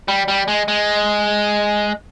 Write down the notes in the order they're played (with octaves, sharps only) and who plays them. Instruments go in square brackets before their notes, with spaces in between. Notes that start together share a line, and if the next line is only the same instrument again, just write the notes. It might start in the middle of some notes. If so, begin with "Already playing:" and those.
[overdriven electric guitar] G3
G3
G#3
G#3